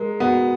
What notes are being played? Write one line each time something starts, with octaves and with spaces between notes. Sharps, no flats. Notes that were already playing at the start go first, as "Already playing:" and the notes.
Already playing: G#3 A#4
B3 F#4